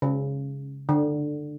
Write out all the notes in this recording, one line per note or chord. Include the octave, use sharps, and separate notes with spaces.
C#3
D3